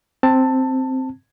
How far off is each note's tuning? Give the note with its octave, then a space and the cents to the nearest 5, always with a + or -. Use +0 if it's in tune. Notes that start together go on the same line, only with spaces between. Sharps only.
C4 +0 A5 +15